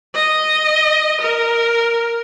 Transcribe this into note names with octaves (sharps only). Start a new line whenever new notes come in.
D#5
A#4